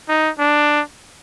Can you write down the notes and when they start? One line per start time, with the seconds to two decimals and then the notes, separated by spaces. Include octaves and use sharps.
0.09 D#4
0.39 D4